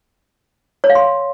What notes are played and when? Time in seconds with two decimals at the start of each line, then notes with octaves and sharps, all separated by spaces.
0.84 C#5
0.90 F5
0.95 C6